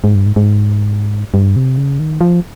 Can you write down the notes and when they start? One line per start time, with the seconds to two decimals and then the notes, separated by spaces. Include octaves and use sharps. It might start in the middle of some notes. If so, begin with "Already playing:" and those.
0.04 G#2
0.15 G2
0.26 G#2
0.36 G#2
1.34 G2
1.56 C3
1.78 C#3
1.99 D#3
2.21 F3